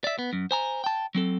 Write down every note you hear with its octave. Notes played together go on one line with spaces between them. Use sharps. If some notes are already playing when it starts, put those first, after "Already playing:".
D5 E5
B3
F#2
C5 G#5 A#5
G5 A5
F#3 C4 A4